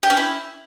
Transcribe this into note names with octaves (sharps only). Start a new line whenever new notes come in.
G4
C#4
E4